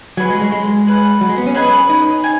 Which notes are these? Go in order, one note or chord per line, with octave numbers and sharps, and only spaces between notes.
F#3 C#4 G#4 B4 G#5
G#3
G#3
G#3
G#4 B4 F#5
F#3
G#3
B3
C#4
G#4 B4 D#5 G#5
D#4
G#5